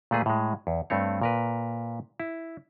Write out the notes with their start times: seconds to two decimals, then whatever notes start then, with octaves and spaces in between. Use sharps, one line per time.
0.11 A#2 A3 G#4 B4
0.26 A2 G#3
0.67 E2
0.90 G2 A3 C4 C#5
1.22 A#2 A#4 B4
2.20 E4